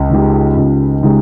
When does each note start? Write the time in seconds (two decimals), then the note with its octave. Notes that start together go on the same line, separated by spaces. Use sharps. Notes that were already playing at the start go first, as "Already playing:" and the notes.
Already playing: C#2
0.10 C#3 G#3 D#4 G4
0.57 C#2
1.03 C#3 G#3 D#4 G4